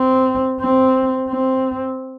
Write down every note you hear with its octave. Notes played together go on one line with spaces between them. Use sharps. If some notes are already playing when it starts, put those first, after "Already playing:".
Already playing: C4
C4
C4